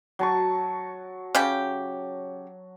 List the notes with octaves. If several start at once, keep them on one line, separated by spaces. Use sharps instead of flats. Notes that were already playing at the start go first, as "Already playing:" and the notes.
F#3 A5 C#6
C#3 G4